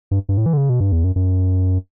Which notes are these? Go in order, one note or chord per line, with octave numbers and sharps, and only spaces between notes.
G2
G2
A2
E3
D3
C#3
B2
G2
E2
F#2
F#2